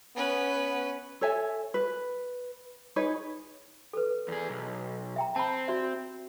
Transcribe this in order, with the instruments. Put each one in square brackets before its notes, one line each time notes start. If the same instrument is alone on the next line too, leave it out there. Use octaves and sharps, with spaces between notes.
[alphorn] B3 [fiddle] C#4 B4
[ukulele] A4 C#5 E5 G#5
B4
D#4 G#4 B4 C#5
[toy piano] A4 B4
[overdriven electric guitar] E2 G#4
B1
[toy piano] E5 G5 A#5
[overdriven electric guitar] C4 [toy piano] A5 B5
[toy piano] F#4 D5 E5